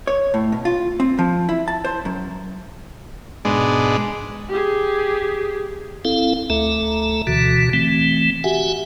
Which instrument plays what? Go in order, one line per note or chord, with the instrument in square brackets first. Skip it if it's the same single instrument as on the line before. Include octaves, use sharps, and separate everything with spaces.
[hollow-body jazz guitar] C#5
A2
B2
F4
C4
F3
E4
A5
C5
F#2
[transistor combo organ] G#2 B2 G#3 D4
[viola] G4 G#4
[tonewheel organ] C4 E4 A4 F5
D2 A3 A4 E5 A#5
D2 B2 D3 E3 F#4
E3 A3 C4
F#4 G4 E5 F#5 G#5